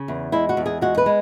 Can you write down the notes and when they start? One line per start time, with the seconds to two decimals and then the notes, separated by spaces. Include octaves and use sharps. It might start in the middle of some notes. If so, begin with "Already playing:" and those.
Already playing: C#3
0.08 E2
0.32 G#3 E4
0.49 F#4
0.57 E2
0.66 G#4
0.81 G#3 F#4
0.97 B4
1.06 G#3